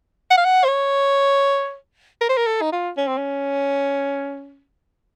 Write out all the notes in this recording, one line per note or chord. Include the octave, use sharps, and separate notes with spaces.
F#5
F5
F#5
C5
C#5
A#4
C5
A#4
A4
D#4
F4
C#4
C4
C#4